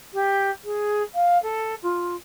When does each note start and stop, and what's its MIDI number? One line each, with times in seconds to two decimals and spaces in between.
0.13 0.50 67
0.64 1.02 68
1.14 1.38 77
1.43 1.75 69
1.82 2.15 65